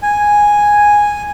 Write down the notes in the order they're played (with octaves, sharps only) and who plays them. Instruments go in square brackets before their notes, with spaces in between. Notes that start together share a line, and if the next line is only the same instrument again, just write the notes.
[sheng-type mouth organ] G#5